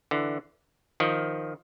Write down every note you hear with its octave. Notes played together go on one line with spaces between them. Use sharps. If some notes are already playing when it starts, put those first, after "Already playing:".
D3 E3
D#3 F3